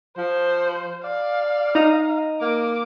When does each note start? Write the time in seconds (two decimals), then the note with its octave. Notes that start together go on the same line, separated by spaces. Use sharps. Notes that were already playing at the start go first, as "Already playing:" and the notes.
0.18 F3 C5
1.04 D5 F5
1.75 D#4 A#5 D#6
2.41 A#3 D6